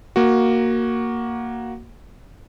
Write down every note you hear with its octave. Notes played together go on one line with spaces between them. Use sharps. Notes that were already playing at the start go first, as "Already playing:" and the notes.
A#3 F#4